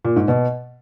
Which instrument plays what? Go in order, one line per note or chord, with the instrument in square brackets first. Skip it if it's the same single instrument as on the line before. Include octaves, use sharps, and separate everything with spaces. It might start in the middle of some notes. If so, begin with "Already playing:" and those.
[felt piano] A#2
G#2
B2